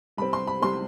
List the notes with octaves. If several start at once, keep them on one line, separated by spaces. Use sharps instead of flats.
C2 C3 G3 C4 B5
C6
B5
C2 C3 G3 C4 C6